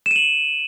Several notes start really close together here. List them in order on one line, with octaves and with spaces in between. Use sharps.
E7 D#7 F#7